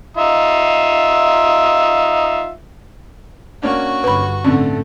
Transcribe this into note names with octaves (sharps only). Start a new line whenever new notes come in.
D#4 F4 E5
A#3 C#4 D4 F#4 C#6
G1 G2 B4 B5
A2 D3 A3 C4 C#4